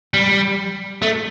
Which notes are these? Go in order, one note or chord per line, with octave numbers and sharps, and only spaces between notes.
G3
A3